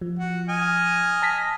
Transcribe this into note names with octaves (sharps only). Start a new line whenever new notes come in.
F3
F#4
D#5 G#5 F6
A5 A#6 B6